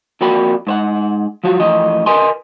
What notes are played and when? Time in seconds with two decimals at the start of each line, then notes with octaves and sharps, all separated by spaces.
0.21 F2 A#3 F#4 D5 G5 B5
0.67 G#2 C5 F#5
1.44 F3 F#3 F4 F#4
1.60 A2 E3 F3 D#5
2.06 A#4 B4 D#5 G#5 C6